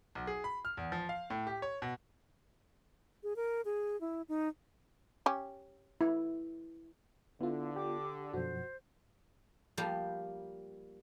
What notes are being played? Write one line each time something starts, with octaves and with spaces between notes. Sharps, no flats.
B1
G#4
B5
F6
E2
F3
F5
A2
G4
C#5
B2
G#4
A#4
G#4
E4
D#4
C#4 G4
E4
D3 B3 E4 F4
G4 D6
F#2 B2 F3 F#4 C5
F3 G3 A#3 G4